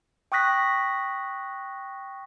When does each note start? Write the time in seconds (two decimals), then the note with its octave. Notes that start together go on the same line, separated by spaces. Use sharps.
0.32 G5 C#6 D#6 F#6 A#6 B6